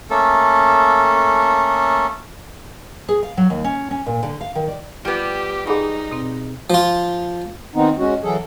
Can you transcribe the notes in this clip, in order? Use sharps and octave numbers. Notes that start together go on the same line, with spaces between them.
A3 A#3 C#4 A4
G#4
F5
F#3
D#2
C#4
C#4
A#2
D3
F5
D#3
D5
G3 B3 F4 G4
D#4 G4 G#4 G#5 B5 D6
B2 C4
F3 F4
D#3 B3 C4 D#4
G#3 C#4 F#4
E3 F#3 G#4 A4